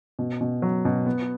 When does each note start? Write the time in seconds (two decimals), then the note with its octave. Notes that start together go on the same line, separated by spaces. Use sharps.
0.19 B2
0.41 B2
0.62 F#3
0.85 B2
1.06 B3